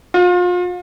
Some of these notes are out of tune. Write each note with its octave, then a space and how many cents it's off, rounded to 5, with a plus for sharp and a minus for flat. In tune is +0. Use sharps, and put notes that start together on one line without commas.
F4 +35